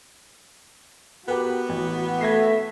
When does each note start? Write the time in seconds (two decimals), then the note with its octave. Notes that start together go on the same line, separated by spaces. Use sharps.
1.28 B3 F#4 G4 A#4 B4
1.69 A1
2.21 A3 E5 G#6 A#6 C7